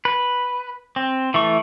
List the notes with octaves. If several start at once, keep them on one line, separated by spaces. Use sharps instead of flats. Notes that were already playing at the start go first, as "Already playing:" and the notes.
B4
C4
E3 A3 C#6